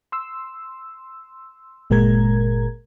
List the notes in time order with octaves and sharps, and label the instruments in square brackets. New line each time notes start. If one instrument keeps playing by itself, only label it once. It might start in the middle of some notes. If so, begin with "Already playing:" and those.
[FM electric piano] C6 E6
G1 A#2 G#3 A#4 A#5 G#6